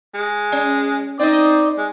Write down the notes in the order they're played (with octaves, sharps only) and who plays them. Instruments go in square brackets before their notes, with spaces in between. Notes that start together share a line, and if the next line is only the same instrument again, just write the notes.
[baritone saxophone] G#3
[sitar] C#4
[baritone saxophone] C4 [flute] D#4 [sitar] D5 D#5
[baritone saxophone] G#3